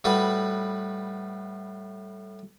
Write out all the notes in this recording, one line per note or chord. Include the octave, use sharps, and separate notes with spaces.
A2 G3 F#4 B4 B5 D#6